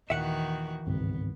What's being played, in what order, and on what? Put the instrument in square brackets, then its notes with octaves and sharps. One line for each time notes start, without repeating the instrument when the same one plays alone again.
[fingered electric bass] D#2 A#2 [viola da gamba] D#3 E3 F#4 [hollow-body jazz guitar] E5 F#5
[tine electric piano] G#1 [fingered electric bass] C#2 G2 B2 [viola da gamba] B3